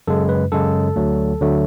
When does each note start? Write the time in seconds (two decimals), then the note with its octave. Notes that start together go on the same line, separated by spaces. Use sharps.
0.07 F#2 C#3 G#3 A4
0.29 B4
0.52 F#2 C#3 G#3 A4
0.96 D2 D3 F#3 A3
1.41 D2 D3 F#3 A3